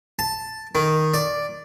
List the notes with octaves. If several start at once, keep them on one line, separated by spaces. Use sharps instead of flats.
A5
D#3
D5